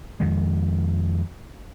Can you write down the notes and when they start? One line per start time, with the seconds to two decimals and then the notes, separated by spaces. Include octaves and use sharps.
0.20 F2 D#3 G#3